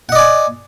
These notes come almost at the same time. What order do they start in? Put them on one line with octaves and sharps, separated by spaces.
F#5 D#5 D5 G#5